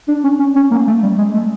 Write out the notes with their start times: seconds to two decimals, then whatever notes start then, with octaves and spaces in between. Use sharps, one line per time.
0.08 D4
0.24 C#4
0.39 C#4
0.56 C#4
0.71 A#3
0.87 A3
1.03 G3
1.18 G#3
1.34 A3